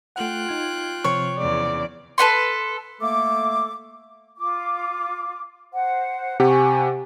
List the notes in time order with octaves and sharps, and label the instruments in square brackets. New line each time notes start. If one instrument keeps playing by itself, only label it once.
[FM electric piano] A3 F#5 [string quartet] F4 G5 F#6
[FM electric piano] D#4 G#6
[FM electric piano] C3 F3 C4 [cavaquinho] C#5
[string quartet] E2 C#3 [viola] D5
[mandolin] A4 B4 F#5 C6
[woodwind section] A3 A#3 A4 D6
[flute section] F4 D6
C5 F#5
[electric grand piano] C3 G4 F#5 [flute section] G#5 C#6